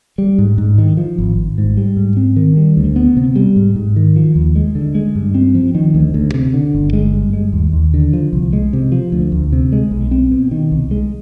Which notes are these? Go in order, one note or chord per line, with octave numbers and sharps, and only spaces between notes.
G3
G#2
G#2
D#3
F3
G#1
G#1
G#2
G3
G#2
C4
D#3
G3
D2
B3
C3
G3
G#2
G#2
D#3
F3
D#2
G#3
D3
G#3
G2
C4
F3
D#3
D2
D2
C3
D3
G1
G#3
G2
G#3
D#2
D#2
D3
F3
C2
G#3
C3
F3
D2
D2
C3
G#3
B1
C4
B2
D#3
C2
G#3